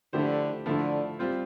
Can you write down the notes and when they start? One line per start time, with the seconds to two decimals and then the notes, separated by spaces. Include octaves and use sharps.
0.13 D3 F3 A3 E4 G4 C5
0.66 D3 F3 A3 E4
1.19 G3 C4 F4 C5